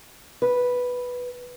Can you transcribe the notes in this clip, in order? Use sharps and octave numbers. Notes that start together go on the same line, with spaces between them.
B4